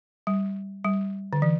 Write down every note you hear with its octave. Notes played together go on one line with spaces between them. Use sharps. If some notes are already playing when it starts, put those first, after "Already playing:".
G3
G3
D3
E3